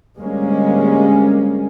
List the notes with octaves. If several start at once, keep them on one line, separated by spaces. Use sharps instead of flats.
D2 G3 G#3 A#3 C#4